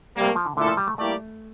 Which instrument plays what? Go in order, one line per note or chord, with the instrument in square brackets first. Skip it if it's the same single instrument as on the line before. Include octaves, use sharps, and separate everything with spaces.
[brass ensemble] C3 G3 A#3
[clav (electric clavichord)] A3
F3
D3
[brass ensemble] A#2 A3 E4 A4 [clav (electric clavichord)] D3
[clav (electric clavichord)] F3
G3
A3
[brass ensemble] G3 A#3 E4 G4 D5 [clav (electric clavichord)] A3